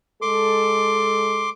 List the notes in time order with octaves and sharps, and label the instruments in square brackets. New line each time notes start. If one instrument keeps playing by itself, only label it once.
[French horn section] G#3 A4 [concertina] C6 D6